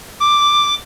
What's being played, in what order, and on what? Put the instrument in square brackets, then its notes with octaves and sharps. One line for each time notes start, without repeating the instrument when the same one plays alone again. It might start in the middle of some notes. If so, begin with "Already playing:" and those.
[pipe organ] D6